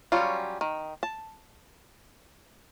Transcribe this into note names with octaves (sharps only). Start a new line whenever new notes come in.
F#3 G3 C#4 F4
D#3
A5